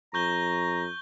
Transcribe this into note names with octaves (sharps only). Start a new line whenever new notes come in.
F2 A#5 C#6 G6 G7